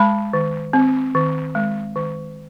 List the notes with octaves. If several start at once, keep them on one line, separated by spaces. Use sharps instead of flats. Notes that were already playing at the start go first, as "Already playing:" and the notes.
Already playing: G#3 A5 B5
D#3
C4
D#3
G#3
D#3